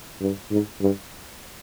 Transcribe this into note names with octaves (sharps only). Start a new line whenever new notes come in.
G2
G#2
G2